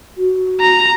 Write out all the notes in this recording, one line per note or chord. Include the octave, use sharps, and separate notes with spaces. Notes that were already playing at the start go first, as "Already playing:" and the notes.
F#4
A#5